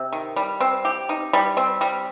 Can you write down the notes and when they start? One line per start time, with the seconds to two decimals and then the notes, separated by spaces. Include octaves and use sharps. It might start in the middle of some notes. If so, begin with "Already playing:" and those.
Already playing: C3
0.13 D#3
0.36 G3
0.61 C4
0.85 G4
1.09 D#4
1.33 G3
1.57 C4
1.81 G3